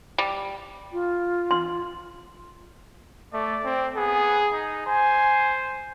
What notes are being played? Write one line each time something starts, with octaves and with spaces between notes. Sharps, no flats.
G3
F4
C6
A3 D5
C4
B3 G#4
D#4
C5 G#5